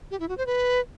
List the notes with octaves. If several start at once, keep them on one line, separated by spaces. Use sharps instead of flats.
G4
E4
F#4
C5
B4